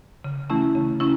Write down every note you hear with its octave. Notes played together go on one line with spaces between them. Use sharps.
C#3
E3 A3 C#4 E4
C#3
C#4 E4